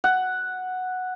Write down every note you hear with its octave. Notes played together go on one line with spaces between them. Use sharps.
F#5